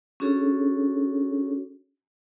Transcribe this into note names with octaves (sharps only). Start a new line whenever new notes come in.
C#4 D4 F#4 G#4 A4 C#5